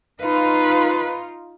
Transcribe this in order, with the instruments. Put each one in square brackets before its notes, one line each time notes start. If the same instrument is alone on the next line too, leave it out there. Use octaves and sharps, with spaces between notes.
[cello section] D#4 F4 [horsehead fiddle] B4